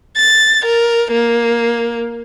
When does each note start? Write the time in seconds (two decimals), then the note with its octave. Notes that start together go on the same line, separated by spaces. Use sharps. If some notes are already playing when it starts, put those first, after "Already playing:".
0.17 A6
0.65 A#4
1.11 A#3